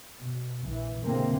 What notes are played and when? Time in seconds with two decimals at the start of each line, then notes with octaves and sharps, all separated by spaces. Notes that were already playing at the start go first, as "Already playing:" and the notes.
0.20 B2
0.64 A#1 E3
1.04 B2 D3 E3 G#3 A#3 C4